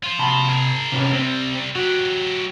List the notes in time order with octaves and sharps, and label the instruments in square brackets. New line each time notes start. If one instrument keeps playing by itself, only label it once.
[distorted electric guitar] F4 C5
[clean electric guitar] C3 A5 B5
[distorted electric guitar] G#4 A#4
[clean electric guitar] C3 C#4 B4
[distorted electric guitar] C3 G3 [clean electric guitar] C4
[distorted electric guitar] F#3 G4 [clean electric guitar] F#4